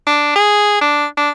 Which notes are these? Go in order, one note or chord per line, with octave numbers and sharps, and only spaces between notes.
D4
G#4
D4
D4